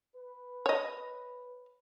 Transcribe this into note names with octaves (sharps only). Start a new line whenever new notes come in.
B4
C#5 D#5